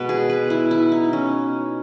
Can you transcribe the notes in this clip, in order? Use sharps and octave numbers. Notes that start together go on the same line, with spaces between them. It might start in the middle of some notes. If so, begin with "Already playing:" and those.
Already playing: B2 G#3 B3 B4
G#4
B4
E4
E4
D#4
C#4